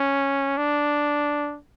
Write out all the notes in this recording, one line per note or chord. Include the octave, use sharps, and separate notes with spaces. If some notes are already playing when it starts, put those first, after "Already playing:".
Already playing: C#4
D4